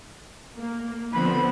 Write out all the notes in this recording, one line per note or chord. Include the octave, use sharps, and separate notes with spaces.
A#3
D3 F3 B3 C4 B5